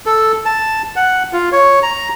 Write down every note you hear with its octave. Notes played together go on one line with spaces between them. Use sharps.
A4
A5
F#5
F4
C#5
A#5